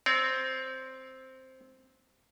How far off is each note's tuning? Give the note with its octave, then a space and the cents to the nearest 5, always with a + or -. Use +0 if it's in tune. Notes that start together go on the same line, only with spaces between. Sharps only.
C4 +0 C#5 +45